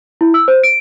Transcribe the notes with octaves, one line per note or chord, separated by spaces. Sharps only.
E4
E6
C5
D7